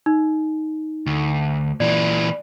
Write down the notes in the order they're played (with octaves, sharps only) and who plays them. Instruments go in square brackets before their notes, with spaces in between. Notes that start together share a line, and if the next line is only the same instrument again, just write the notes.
[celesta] D#4
[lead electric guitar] D2
[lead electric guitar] A#2 E3 [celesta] D5